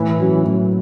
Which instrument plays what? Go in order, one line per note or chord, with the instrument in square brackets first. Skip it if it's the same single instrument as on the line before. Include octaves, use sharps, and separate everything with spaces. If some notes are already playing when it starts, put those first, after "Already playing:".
Already playing: [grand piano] A2 [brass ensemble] E3
[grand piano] F#3 C#4 F#4
[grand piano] A2 [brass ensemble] F#3